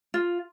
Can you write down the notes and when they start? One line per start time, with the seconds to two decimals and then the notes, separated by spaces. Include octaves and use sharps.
0.14 F4